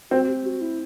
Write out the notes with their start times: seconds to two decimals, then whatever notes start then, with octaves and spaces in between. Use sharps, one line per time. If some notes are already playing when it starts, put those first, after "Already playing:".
0.11 C4 F#4
0.28 G4
0.46 F#4
0.61 E4